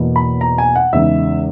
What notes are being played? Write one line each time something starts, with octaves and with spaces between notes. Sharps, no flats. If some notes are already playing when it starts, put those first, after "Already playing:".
Already playing: E2 B2 A#3 E4
B5
A#5
G#5
F#5
E2 C#3 G#3 D#4 E5